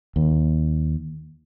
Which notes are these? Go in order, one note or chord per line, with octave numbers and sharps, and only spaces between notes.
D#2